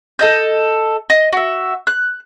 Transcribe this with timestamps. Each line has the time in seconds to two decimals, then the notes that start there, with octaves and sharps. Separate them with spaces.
0.19 A4 D#5 G6
1.10 D#5
1.33 F#4 E5
1.87 F#6